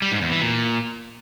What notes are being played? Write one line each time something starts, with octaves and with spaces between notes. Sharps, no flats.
G3
G#2
E2
E3
A#2